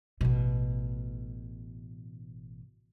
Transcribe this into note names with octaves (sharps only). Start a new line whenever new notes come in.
A1 B2